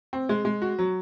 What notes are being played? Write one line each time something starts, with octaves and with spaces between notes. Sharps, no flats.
C4
G#3
G#3
F#4
F#3